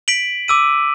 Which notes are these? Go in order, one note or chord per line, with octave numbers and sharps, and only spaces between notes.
B6 D7 F#7
D6 E6 D#7